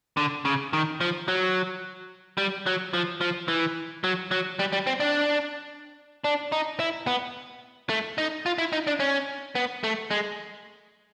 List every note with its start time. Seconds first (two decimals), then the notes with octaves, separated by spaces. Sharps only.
0.17 D3
0.45 C#3
0.73 D#3
1.01 F3
1.28 F#3
2.38 G3
2.66 F#3
2.93 F3
3.21 F3
3.48 E3
4.04 F#3
4.31 F#3
4.59 G3
4.73 G3
4.87 C4
5.00 D4
6.24 D4
6.52 D#4
6.80 E4
7.07 B3
7.89 A3
8.18 D#4
8.46 F4
8.58 E4
8.73 D#4
8.87 D4
9.00 C#4
9.55 B3
9.84 A3
10.11 G#3